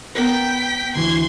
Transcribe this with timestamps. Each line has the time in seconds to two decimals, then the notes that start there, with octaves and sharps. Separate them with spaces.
0.15 B3 A#4 B4 G5 B6
0.95 D2 E3 C6 G#6